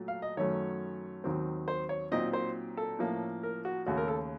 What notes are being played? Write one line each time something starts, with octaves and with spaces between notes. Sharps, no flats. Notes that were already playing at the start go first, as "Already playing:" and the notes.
Already playing: A#2 F#3 A3
F5
D#5
F#2 D#3 F#3 A3 C#4 C#5
D#2 D#3 F#3 C4
C5
C#5
A#2 F#3 C4 D#4 D#5
C5
A4
A2 F3 A#3 C#4
A#4
F#4
D#2 C#3 A3 C#4 F#4
A#4
A4